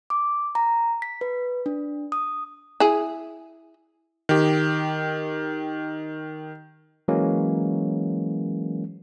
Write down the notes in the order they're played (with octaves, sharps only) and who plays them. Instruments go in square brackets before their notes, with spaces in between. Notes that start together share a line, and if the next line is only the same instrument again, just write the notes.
[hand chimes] D6
A#5
B6
B4
D4
D#6
[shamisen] E4 G#4
[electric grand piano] D#3 G4
[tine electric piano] E3 F#3 G#3 A#3 C#4